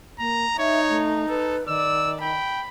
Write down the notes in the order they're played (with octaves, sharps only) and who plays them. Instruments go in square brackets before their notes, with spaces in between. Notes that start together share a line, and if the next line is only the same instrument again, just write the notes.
[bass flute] A#3 [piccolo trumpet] A#5
[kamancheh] D#4 [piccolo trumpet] C#5 [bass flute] E5
[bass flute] A3
[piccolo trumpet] A4 [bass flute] B4
[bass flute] D#3 [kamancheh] D5 [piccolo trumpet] E6
[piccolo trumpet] G5 [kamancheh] B5